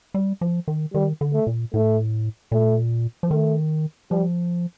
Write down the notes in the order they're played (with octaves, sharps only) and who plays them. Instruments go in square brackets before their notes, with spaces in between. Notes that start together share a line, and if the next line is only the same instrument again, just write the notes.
[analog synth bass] G3
F3
D#3
[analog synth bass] D#3 [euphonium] G3
[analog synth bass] D3
[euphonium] A3
[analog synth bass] A#2
[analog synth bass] A2 [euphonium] A3
[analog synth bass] A#2 [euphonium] A3
[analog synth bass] F3
[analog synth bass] D#3 [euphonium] A3
[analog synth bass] F3 [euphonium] G3